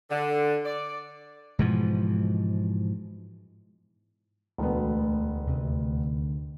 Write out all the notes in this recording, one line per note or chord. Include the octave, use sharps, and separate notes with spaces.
D3
D5
G#2 B2 E3 F3
E1 D2 B3
D#2 C3